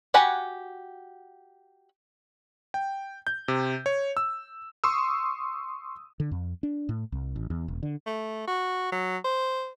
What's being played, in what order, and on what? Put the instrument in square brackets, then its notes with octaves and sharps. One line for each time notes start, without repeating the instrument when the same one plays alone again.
[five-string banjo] F#4 G4 F#5 G#5 B5
[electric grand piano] G5
G6
C3
C#5
E6
C6 C#6 D#6 E6
[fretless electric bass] D3
F2
D4
A2
C2
A1
E2
E1
D3
[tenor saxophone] A3
F#4
F#3
C5